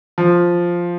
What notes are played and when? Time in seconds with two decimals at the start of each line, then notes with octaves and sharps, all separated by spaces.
0.18 F3